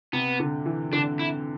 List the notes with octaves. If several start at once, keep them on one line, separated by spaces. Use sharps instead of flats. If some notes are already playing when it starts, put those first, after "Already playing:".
C3 B3
D3
E3
D3 D4
E4